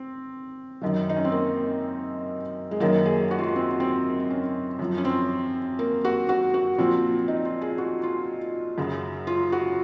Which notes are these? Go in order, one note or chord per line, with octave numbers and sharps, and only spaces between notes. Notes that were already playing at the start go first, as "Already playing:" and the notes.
Already playing: C4
F#2 D#3 F#3
D#4
C#4
C4
A#3
G#3
F#2 D#3 F#3 A#3
G#4
F#4
F4
F#4
C4
C4
C#4
F#2 F3
C#4
C4
A#3
F#4
F#4
F#4
A#2 F3 C4
D#4
F4
G#4
F#4
F4
F#2 C#3 F#3
F4
F#4